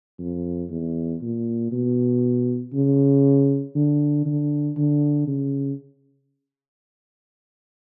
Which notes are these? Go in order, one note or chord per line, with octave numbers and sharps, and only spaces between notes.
F2
E2
A#2
B2
C#3
D3
D3
D3
C#3